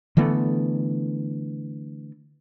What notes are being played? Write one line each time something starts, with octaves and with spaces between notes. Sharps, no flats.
D3 E3 A3 B3